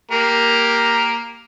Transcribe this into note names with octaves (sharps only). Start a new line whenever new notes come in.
A#3 G4 A#4